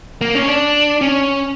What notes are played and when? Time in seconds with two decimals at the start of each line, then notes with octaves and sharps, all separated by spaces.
0.21 A#3
0.35 C#4
0.48 D4
1.02 C#4